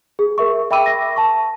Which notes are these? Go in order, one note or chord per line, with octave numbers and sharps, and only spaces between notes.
G#4
A#4 E5 C#6
E5 G5 B5 D6 E6 D#7
A#6
A5 C#6